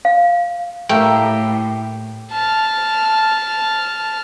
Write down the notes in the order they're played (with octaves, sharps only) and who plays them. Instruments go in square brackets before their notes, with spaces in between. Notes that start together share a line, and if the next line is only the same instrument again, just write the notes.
[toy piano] F5
[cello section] A2 [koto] A3 A#3 [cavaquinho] G4
[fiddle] A5 F6